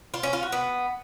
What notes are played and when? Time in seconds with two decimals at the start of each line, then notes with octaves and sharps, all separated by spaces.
0.14 F4
0.23 C#4
0.33 F4
0.43 F#4
0.52 B3